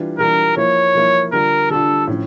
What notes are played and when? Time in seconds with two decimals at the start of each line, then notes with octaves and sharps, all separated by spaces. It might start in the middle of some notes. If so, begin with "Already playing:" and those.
Already playing: E3 G3 D4 F4
0.18 E3 G3 D4 F4 A#4
0.56 F3 A#3 E4 C#5
0.95 F3 A#3 E4
1.32 D3 G3 D4 F4 A#4
1.70 D3 G3 D4 F4 A4
2.07 A2 F3 C#4